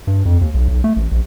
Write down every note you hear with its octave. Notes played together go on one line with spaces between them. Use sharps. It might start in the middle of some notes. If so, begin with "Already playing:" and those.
G2
F2
D#2
B1
B1
A3
A1
A#1